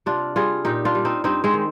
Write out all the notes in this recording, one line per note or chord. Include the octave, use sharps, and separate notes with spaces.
C3 D4 F4
G3 F4 G#4
A#2 D#4 G4
D4 F4
G3
C4 D#4
G2 C4 D#4
G#3 C4
D#3